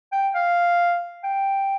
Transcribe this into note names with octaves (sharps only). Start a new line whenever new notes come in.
G5
F5
G5